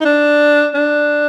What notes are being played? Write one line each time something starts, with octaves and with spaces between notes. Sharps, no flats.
D#4
D4
D4